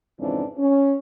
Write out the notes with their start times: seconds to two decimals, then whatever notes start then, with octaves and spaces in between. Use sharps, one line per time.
0.20 F2 G#2 C#3 E3 C4 D4
0.58 C#4